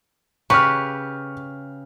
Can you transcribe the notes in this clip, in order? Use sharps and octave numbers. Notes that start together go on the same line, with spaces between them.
C#3 G4 B4 C#6 F6